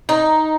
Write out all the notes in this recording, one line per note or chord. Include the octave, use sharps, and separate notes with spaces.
D#4